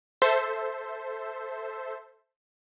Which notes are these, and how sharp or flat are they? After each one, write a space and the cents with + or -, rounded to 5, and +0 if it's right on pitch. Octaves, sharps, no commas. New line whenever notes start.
A4 +0 C5 +0 E5 +0